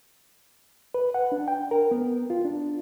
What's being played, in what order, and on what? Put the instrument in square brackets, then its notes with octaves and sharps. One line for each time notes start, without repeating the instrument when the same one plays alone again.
[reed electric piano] B4
F#5
D4
G5
A#4
B3
F4
D4